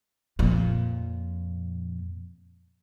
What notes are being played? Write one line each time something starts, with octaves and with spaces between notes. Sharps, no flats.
F2 A#2